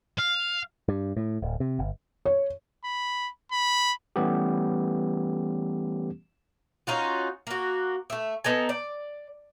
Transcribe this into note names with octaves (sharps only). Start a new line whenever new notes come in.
F5
G2
A2
D1
C3
G1
C#5
B5
B5
E3 G3 A3 B3 C#4 G4
C#4 D#4 F4 F#4
A#3 F#4
A3 E5
B3 D#4 A4 G#5
D5